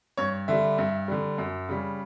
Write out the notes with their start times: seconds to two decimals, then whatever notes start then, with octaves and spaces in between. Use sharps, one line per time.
0.17 G2 C#5
0.48 D3 G3 E5
0.78 G2
1.08 D3 G3
1.38 F#2
1.69 C#3 G3